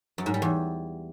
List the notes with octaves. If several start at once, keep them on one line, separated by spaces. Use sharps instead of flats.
F#2
G#2
G3
E2